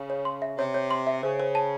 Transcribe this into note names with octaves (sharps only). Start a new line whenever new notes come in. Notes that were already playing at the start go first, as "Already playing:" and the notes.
Already playing: C#3
C#5
C6
E5
C3 C#5
C#5
C6
E5
C#3 C5
C5
A5